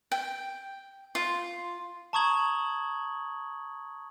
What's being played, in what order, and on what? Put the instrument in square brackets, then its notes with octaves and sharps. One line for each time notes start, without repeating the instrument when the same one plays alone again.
[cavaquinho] G5
F4
[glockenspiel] A5 A#5 C#6 D#6 G#6 F#7